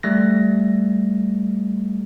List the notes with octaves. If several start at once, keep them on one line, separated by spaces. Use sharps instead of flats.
G3 A3 A#6